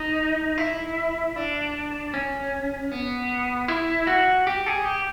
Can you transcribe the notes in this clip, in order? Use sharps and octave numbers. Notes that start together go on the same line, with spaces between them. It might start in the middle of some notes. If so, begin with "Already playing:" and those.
Already playing: D#4
E4
D4
C#4
B3
E4
F#4
G4
G#4
G4